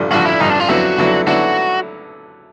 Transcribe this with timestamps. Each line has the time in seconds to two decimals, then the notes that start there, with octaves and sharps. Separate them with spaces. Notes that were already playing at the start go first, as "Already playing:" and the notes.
Already playing: A1 G2 D3 F3
0.11 A1 G2 D3 F3 F#4
0.25 E4
0.40 A1 G2 D3 F3 D#4
0.50 D4
0.60 F4
0.69 F2 D3 F#3 B3 E4 F#4
0.98 F2 D3 F#3 B3 E4
1.27 D3 F#3 B3 E4 F#4